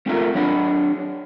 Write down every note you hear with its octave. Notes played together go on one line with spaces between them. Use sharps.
A3 C4 F4 A4 A#4 E5
F#3 D4 C#5 F#5 A5 B5